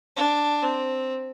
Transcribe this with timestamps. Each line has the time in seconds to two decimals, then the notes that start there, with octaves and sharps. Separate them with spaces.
0.16 D4
0.63 C4